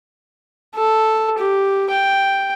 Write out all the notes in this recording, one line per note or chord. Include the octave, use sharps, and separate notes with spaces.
A4
G4
G5